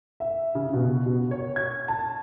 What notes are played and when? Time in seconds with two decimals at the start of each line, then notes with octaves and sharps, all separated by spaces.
0.20 E5
0.55 C#3
0.73 B2
1.06 B2
1.31 C#5
1.56 G#6
1.88 A5